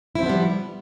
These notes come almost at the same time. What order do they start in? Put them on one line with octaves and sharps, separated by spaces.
E4 C4 F3 B3 G3